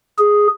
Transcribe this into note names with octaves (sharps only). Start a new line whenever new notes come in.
G#4